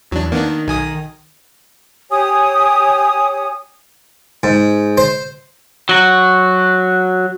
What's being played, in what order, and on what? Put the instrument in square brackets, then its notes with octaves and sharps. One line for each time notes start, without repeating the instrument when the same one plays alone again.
[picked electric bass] E2 [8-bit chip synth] F#3 D4
[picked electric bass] D#3 [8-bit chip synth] A#3 B3 D4
[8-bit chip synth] B1 G#5 D#6
[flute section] G4 C#5 G#5 D#6
[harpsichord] G#2
C5
[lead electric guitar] F#3 F#4